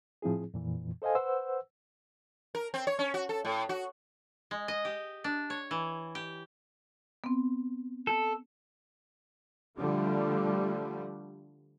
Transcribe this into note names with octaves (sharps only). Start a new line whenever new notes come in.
A2 F3 C4 E4 G#4
F2 A#2 E3
A4 C5 D#5 F5 G#5
B4 C5 F#5 E6
A#4
C4
C#5
C#4
F#4
A4
A2
F#4
G#3
D#5
G4
D4
C#5
E3
G4
B3 C4
A4
D3 F3 G3 A3